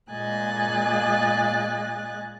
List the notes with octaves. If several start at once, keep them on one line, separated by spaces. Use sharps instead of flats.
A#2 G#3 D#5 G#5 F#6 A6